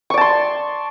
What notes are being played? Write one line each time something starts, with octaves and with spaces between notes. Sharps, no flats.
D5 A5 C6 C#6